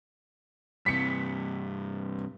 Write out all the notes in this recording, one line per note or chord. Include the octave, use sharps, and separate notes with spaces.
G2 C3 B6 C#7